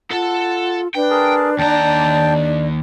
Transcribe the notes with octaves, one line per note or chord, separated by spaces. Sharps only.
F4 A4 F#5 A5
D4 B4 G5
G#4 A#4 A5
D#2 D5 G5 A5 A#5
D4